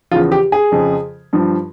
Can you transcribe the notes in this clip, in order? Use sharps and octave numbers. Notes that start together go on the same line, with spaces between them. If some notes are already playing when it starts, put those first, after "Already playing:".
E2 C#3 F3 F4
G4
G#4
F2 C#3 F3
G2 F3